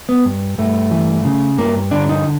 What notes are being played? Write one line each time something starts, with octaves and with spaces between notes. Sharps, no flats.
B3
G2
G2 A3
E3
C#3
G2 A#3
D3 D4
D#4